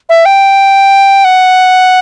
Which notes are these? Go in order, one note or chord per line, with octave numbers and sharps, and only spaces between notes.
E5
G5
F#5